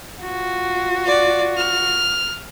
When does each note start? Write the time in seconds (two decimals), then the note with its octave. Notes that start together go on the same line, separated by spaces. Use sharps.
0.22 F4 F#4
1.06 D5
1.57 F6